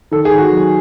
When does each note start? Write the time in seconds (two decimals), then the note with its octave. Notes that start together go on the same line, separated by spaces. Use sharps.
0.11 D#3 A4
0.25 G#4
0.31 D#3
0.38 F#4
0.51 F#3